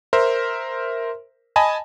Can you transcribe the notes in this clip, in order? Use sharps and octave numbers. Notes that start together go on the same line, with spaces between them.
A#4 C5 E5
D#5 G#5 A5 B5